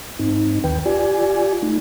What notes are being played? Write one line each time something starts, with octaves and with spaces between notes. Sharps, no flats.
G#2 C4 D#4
D#2 D#3 B4 G5
F4 G4 D5 G#5
A3 D#4